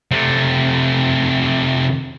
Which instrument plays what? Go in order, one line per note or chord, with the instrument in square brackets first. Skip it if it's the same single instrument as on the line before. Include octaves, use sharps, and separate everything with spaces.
[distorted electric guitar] C3 A3